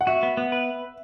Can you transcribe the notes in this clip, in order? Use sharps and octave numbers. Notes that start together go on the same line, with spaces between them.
F#5
F#4 E5
B3
B3
B4